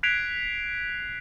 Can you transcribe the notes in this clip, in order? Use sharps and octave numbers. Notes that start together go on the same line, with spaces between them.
F#6 G#6 B6 C7 D7 F7